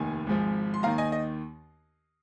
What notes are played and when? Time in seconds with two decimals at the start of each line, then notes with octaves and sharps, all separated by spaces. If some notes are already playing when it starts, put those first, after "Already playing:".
Already playing: F1 D#2 D#3 G#5
0.27 G#1 G#2 F3
0.74 C6
0.83 D#2 D#3 F5 A#5
0.98 D#5 G#5
1.12 D#5